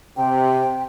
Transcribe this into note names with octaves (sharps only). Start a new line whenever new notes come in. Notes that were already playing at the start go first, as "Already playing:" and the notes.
C3 G5